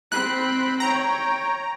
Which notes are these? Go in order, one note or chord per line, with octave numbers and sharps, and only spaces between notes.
C4 B5 F#6
C#5 G5 A#5